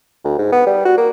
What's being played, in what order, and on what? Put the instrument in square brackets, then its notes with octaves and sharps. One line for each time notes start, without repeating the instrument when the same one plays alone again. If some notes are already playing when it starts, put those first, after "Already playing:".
[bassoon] D2
G#2
B3
G3
F#4
A#3